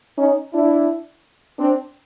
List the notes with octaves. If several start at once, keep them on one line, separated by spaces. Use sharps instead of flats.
C#4 D#4
D4 E4
C4 D4